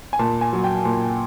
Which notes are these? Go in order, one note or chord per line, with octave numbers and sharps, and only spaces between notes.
G#5
A#2 A5
G#5
F#3
G5
A#2